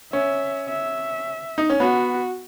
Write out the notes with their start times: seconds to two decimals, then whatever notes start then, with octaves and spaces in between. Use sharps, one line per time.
0.13 C#4 E5
0.69 E5
1.58 D#4
1.70 C#4
1.80 B3 F#4